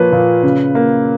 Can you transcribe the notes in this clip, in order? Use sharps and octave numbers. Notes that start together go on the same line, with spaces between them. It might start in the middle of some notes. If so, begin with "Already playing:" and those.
Already playing: A#2 F3 A#3 B4 C#5
A#2
C#3
A#3